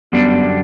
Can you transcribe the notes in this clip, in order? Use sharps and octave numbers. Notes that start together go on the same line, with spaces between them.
F#2 D3 G3 B3 D4